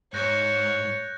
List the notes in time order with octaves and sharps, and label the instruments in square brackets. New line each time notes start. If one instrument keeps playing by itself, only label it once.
[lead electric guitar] G#2 [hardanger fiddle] C#5 [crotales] F#6 G6 A#6